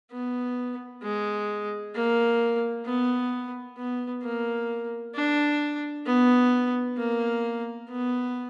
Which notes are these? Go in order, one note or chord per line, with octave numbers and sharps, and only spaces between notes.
B3
G#3
A#3
B3
B3
A#3
D4
B3
A#3
B3